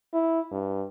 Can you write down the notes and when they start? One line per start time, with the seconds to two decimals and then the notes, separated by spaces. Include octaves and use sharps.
0.13 E4
0.52 G2